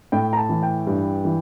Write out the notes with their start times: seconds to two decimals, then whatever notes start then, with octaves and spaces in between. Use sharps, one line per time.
0.12 A2 G5
0.33 A#5
0.37 A5
0.49 E3
0.63 G5
0.87 G2
1.25 E3